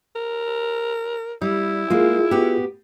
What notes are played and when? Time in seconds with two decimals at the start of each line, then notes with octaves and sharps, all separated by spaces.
0.16 A#4
1.42 G3 E4
1.90 G#3 A#3 F4 G#4
2.31 B3 F#4 G4